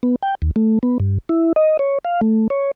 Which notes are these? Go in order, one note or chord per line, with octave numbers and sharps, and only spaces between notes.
B3
G5
D#2
A3
B3
G2
E4
D#5
C#5
F5
A3
C#5